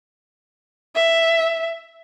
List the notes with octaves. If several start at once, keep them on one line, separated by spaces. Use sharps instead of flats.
E5